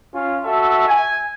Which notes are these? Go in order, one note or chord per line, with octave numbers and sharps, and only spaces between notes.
C#4 F4
F#4 A4 E5
G#5